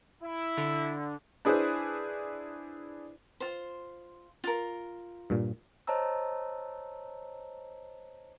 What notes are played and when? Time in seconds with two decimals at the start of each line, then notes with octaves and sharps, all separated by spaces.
0.22 E4
0.57 D3
1.45 D4 E4 G#4 B4 C5
3.40 F4 C5
4.44 F4 A#4
5.30 G2 A#2
5.87 C5 C#5 D#5 A5 A#5 E6